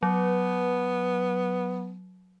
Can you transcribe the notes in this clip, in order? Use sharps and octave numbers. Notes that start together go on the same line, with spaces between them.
F#3 B3